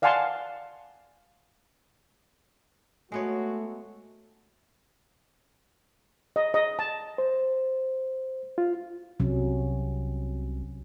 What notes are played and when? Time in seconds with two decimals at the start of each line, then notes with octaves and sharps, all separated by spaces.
0.02 D5 F5 F#5 G#5 A5 C6
3.12 G#3 A3 B3 F#4 C#5
6.36 D#5
6.54 D#5
6.79 A5
7.18 C5
8.58 F4
9.20 C2 C3 F#3 C#4